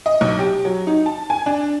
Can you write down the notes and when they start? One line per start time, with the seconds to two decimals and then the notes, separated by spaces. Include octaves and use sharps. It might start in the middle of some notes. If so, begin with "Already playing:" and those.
0.06 D#5
0.21 B1
0.39 G4
0.65 F#3
0.87 D#4
1.06 A5
1.30 G#5
1.46 D4